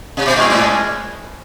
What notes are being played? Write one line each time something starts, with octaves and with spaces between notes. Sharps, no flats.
C3
B2
A#2 G#3 C#4 E4 G#4
A2